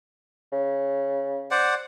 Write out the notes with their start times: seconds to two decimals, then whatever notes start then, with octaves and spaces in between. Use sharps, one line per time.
0.52 C#3
1.51 C5 D5 F#5